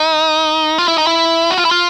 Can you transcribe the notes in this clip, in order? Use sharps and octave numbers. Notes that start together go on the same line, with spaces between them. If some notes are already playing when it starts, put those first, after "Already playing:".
Already playing: D#4
F4
E4
D#4
E4
F#4
F4
E4
F4